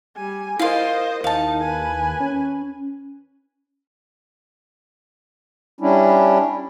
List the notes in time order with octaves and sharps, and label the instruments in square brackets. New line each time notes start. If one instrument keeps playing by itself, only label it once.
[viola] G3 G#5
[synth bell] E4 A#4 [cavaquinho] F4 F5 [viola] C5 D#5
[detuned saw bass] D#2 [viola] D#4 [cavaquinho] F5 A5
[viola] B4 G#5
[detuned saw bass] C#4
[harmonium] G3 C#4 D4 E4